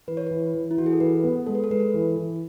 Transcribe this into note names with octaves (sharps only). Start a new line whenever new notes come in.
E3 B4
C#5
E3 B4
E3
E4
E3 F#4
G#4
A4
E3 B4
B3
G#3 A4
B4
A4
G#3 B4
A4
E3
E3